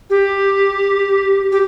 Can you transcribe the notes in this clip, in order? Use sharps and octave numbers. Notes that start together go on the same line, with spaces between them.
G4
G4